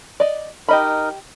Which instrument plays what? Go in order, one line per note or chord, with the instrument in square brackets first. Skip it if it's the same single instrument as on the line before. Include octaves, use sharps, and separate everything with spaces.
[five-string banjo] D5 D#5
[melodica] D#4 A#4 [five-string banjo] G4 D#5 B5